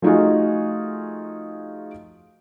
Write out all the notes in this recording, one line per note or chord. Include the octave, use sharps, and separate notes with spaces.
F3 A3 D#4 F4 F#4 G#4